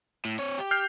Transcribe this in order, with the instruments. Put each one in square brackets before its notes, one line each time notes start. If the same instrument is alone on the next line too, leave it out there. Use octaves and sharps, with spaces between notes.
[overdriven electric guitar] A2
C4 C#5
G4
[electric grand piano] F6 G6 C7